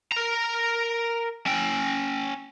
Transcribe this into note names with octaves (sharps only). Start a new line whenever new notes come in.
A#4 A#5
C#4 G5